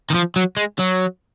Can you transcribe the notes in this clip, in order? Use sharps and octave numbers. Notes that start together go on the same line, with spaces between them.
D#3
F3
F#3
G#3
F#3